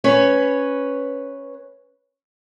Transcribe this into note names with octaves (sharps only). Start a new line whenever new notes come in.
C#4 B4 C#5